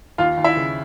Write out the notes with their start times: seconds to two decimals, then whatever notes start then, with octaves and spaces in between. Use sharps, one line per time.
0.18 D#2 F4 F5
0.37 D#2
0.44 E4 E5
0.57 C#3